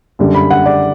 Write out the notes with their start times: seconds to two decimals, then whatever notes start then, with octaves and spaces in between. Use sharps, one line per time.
0.19 F#2 D3 G3
0.35 B5
0.51 F#5
0.66 D5